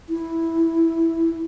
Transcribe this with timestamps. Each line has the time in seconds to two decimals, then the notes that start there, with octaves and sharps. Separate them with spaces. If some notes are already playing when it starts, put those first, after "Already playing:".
0.09 E4